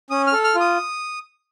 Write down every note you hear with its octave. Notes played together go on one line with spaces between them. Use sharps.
C#4 D#6
F6
A4
F6
F4
D#6